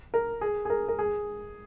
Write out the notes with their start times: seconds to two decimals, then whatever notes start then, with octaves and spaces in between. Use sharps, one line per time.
0.14 A#4
0.41 G#4
0.65 G#4
0.70 A#4
0.88 A#4
0.99 G#4